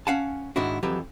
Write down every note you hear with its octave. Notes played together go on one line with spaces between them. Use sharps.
C#4 F5 F#5 G#5 A5
G#2 D#3 D4 E4 F#4
F2 E3 F#3 G4 B4